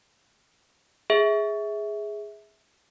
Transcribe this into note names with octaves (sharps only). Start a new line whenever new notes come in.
G#4 E5